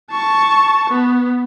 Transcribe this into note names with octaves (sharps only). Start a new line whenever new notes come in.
A5 C#6
B3